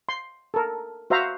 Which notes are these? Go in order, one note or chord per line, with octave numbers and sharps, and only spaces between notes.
C6
A4 A#4
F#4 C5 E5 F5 A#5